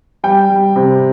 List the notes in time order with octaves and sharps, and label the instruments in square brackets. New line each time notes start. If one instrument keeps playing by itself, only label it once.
[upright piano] G3 G5
G3
C3